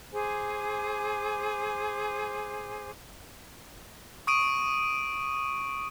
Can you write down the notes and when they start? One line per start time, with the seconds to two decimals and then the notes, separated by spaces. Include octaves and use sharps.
0.12 G#4 C5 G#5 D6
4.27 C#6 D#6 D7 D#7